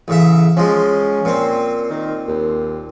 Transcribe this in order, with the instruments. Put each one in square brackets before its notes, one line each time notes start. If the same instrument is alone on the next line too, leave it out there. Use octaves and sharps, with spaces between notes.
[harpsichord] A1 C#3 E5
[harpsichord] F3 G#3 [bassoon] C#4
[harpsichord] A#2 C4
[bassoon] D#3
D#2